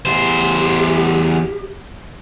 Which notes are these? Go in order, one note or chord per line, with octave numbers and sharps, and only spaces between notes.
E2 G4 C5